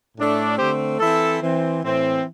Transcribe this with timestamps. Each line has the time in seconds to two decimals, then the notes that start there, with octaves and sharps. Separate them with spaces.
0.18 A2 A3 D4
0.59 D3 A3 C4 G4 C5
1.00 E3 C4 E4 A4
1.41 E3 C4
1.83 A2 E3 C4